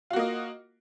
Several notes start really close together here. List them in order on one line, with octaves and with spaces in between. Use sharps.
F4 F#4 A#3 D#5